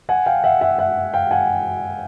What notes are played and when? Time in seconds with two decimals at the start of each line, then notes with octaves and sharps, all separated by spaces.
0.09 F#5 G#5
0.26 F5 G5
0.44 E5 F#5
0.61 E5 F#5
0.78 E5 F#5
1.14 F5 G5
1.31 F#5 G#5